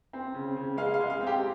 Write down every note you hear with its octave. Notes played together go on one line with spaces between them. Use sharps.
C4
C#3
C#3
G#3 F5
F5
G#3
F5
C4
G4